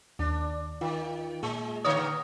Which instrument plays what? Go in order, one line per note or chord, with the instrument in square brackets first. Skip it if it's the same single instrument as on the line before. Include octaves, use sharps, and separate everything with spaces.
[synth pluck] D#2 [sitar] D4
[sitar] D#3 [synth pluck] F4
[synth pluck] A#2 [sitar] G#3
[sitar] D3 C#5 [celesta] D#6 [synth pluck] F6 A#6